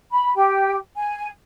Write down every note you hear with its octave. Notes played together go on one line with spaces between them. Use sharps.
B5
G4 G5
G#5